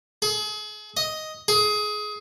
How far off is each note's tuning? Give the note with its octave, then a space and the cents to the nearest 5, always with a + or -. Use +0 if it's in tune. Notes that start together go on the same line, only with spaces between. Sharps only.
G#4 +35
D#5 +5
G#4 +20